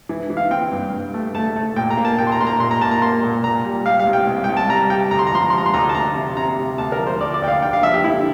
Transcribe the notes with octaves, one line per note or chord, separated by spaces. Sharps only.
E3
E3
F5
C4 G5
G2
G2
A3
A3 A5
A3
A#2 G5
A#5
A#3
A5
A#2 G5
C6
A#5
A#3 C6
A#5
A#2 C6
A#5
A#3 A5
A#5
A#3 C6
A#2
A#2 A#5
G3
G3 F5
F5
C2
G5
C2
C2 G5
A5
G3 A#5
G3 G5
D2 A#5
C6
A#5
F3 C6
A#5
C6
F3 A#5
C6
D2 A#5
A5
D2 A#5
C3
C3 A#5
C3
D2 A5
A#4
F3
C5
D2 D5
D5
D2 G5
F5
D3 G5
F5
F3 E5
G4
D3 E4